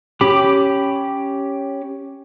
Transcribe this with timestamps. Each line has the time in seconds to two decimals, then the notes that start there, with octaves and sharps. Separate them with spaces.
0.21 C#4 G4 B5 D6